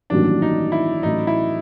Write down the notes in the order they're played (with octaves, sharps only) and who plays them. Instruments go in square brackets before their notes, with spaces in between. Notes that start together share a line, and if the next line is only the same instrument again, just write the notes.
[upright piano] A1 G2 D#3 F#3 A#3 [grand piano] D4
[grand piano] D#4
E4
[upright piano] A1 A2 F#3 [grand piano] D#4
[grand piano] E4